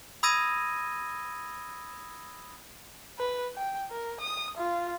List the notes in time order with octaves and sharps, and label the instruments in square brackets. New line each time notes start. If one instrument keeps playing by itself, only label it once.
[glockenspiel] B5 D#6 E6 G#6 A#6 D#7
[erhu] B4
G5
A#4
D#6
F4